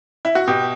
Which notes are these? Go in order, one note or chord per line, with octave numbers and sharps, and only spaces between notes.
E4
F#4
B2 G4